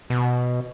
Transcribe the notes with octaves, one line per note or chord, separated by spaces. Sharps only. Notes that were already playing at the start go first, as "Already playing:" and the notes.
B2